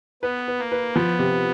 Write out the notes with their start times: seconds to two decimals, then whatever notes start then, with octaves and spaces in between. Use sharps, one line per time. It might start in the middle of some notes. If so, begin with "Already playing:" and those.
0.23 B3 B4
0.48 B4
0.59 A#3
0.72 B4
0.95 F3 B3
1.19 C3